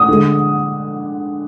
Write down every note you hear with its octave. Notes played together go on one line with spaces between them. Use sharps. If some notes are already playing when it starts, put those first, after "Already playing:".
Already playing: D#6
D3 G#3